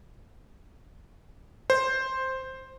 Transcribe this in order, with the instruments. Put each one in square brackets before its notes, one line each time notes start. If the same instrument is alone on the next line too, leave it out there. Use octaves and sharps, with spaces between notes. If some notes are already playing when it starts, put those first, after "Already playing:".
[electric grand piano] C5